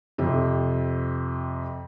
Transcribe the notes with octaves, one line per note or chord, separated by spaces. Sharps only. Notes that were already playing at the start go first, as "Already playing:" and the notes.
F2 C3